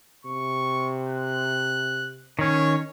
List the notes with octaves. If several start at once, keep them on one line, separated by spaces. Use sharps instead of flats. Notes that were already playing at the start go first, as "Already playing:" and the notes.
C3 C#6
F#6
D#3 C#4 C#5